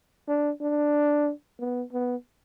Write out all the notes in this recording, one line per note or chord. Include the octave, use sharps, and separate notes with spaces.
D4
D4
B3
B3